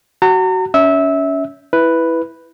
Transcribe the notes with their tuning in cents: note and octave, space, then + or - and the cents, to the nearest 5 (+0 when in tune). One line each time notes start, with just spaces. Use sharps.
F#4 +20 A#5 -40
C#4 +30 E5 -20
E4 +0 B4 +0